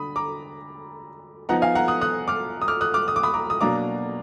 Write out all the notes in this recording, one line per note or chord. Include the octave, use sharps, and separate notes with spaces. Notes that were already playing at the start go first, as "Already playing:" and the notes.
Already playing: D3 B5 D#6
A#5 D6
F3 B3 D#4 F#5 A#5
F5 G#5
F#5 A#5
D#6 F#6
D#6 F#6
D6 F6
D#6
D6 F6
D#6 F#6
D6 F6
D#6
D6
B5 D#6
A#5 D6
D#6
B2 F#3 A#3 D4 A#5 D6